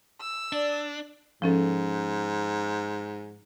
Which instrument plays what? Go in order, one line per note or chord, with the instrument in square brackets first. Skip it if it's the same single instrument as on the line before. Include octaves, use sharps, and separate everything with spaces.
[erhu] E6
[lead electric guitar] D4 [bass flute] D5
[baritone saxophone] G#2 [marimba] F3 C#4 A4